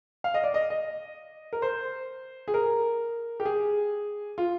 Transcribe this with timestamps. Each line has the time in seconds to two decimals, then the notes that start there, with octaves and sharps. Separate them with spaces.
0.24 F5
0.34 D#5
0.44 D5
0.54 D#5
0.70 D#5
1.53 A#4
1.62 C5
2.48 G#4
2.54 A#4
3.40 G4
3.45 G#4
4.38 F4